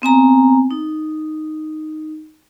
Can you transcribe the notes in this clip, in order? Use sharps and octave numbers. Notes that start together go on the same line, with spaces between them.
B3 C4 G#5 A#5
D#4